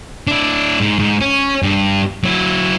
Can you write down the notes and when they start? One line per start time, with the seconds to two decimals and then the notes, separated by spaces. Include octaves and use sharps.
0.27 D4 E4
0.80 G#2
0.99 G#2
1.21 C#4
1.63 G2
2.24 F#3 E4